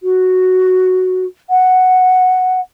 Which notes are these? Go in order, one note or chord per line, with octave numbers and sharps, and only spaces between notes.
F#4
F#5